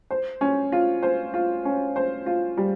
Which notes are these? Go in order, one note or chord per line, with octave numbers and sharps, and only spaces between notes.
C5
C#4
F4
C5
F4
C#4
C5
F4
G3